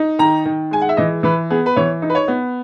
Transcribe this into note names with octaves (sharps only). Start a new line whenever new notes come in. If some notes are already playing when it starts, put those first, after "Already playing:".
Already playing: D#4
D#3 A#5
D#3
G#3 G#5
F#5
E5
E3 D#5
E3 B4
B3 G#4
B4
E3 C#5
D#4
B4
C#5
B3